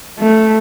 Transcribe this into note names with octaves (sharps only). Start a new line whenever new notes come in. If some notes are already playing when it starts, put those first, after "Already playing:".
A3